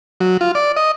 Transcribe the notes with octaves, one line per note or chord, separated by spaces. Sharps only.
F#3
F4
D5
D#5